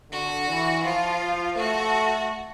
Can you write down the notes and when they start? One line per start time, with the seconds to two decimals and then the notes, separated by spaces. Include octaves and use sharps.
0.11 D3 F#4
0.48 E3
0.84 F3 F4
1.20 F3
1.57 A3 F#4